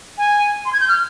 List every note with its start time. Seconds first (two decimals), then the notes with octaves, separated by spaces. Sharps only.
0.18 G#5
0.65 C6
0.73 G#6
0.80 G6
0.88 F6